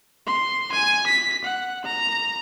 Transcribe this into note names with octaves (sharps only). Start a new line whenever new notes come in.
C6
G#5
B6
F#5
A#5